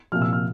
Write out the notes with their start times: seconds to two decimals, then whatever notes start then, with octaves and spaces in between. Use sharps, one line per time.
0.12 C2 A#2 F3 F6
0.22 E6
0.33 F6